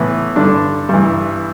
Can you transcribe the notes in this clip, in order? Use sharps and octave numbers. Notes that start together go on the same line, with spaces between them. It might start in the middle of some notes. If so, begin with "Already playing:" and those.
Already playing: A2 E3 B3
G2 D3 D4
G2 E3